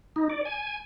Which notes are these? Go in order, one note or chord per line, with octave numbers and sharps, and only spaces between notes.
D#4
D5
G#5